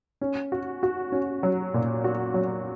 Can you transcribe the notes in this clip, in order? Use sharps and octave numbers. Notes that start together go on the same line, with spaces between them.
C#4
F#4
F#4
C#4
F#3
A#2
F#4
F#3